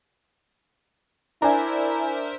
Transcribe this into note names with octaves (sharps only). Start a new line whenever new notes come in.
D4 E4 A#4 C5 E5 G#5 A#5